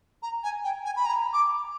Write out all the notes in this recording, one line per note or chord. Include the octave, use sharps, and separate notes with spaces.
A#5
G#5
G5
G#5
B5
A#5
D6